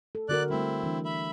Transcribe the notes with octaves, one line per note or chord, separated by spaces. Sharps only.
A4
D3 F#4 A#4 D5 F#6
G3 A3 C4 E4
E3 D4
E5 B5